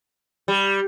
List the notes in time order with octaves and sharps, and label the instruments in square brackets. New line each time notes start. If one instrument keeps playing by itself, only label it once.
[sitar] G3